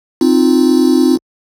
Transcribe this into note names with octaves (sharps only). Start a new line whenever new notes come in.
C4 D#4 F4